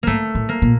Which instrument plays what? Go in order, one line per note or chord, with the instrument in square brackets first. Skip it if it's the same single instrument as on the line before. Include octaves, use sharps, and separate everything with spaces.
[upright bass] G#2 [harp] A3 A#3
[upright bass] A2
[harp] A#3
[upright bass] A#2